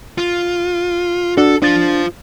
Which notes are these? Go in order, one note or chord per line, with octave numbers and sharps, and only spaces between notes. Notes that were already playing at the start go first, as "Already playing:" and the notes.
F4
D4 F#4 A4
D4 F4 C5 A6